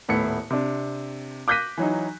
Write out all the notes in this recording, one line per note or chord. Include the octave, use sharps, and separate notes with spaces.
D#1 A2 B3 E4 C#7
C3 D4
D6 F#6 G6 A#6 B6 D#7
E3 F#3 D#4